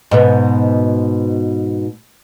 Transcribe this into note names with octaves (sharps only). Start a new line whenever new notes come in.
G#2 B2 B3